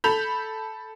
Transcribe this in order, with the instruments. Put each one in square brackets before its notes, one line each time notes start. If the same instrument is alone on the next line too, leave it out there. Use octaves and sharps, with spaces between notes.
[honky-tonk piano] A4 B5 G6 F7